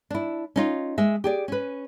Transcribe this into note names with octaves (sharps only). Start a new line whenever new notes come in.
D4 E4
C#4 D#4 F4
G#3 E5
G4 G#4 D5
C#4 B4